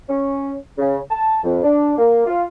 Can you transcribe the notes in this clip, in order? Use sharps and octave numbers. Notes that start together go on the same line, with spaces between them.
C#4
C#3
A5
F2
D4
A#3
F4